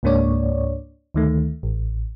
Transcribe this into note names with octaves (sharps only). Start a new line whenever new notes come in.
C#2 G#2 A#3 D4 C#5 D5
D2 D#3 A3
A1